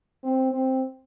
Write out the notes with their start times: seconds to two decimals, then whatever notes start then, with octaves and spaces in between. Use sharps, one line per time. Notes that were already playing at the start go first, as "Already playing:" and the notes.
0.24 C4
0.52 C4